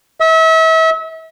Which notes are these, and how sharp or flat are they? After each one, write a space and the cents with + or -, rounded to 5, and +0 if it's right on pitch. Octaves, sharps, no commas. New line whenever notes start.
E5 -35